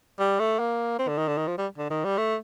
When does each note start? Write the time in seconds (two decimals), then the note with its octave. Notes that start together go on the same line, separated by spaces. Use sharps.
0.19 G3
0.39 A3
0.59 A#3
0.99 C4
1.08 D3
1.18 D#3
1.28 D3
1.37 D#3
1.47 F3
1.58 G3
1.78 D3
1.90 D#3
2.04 G3
2.17 A3